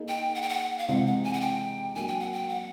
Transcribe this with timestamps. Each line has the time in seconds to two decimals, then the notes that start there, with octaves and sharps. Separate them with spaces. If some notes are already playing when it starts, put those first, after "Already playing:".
Already playing: A#3 D#4 G#4
0.08 G5
0.35 F#5
0.42 G5
0.49 F#5
0.78 F5
0.88 C3 E3 G#3 C4 F#5
1.07 F#5
1.24 G#5
1.33 F#5
1.41 G5
1.95 F#3 A#3 D4 G#5
2.08 G5
2.20 F#5
2.33 G5
2.49 F#5